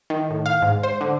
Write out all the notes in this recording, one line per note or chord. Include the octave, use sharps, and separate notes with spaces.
D#3
A2
F5
G#2
C5
D3